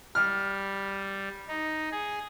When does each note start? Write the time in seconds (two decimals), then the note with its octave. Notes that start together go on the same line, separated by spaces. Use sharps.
0.15 G3 F6
1.48 D#4
1.92 G#4